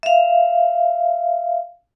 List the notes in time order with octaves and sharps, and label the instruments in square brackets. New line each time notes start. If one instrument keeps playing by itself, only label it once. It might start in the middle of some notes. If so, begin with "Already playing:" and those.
[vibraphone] E5 F5